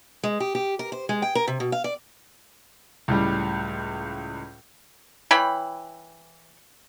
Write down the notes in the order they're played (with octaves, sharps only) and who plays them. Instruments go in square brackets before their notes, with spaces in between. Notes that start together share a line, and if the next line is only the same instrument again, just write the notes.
[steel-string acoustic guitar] G#3
G4
G4
A#4
C5
G#3
G5
A#4
C3
B2
F5
D5
[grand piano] C#2 A2 G3
[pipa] E3 C#5 G5 B5